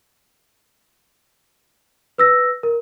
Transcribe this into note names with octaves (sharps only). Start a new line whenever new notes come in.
B4 E6 A#6
A#4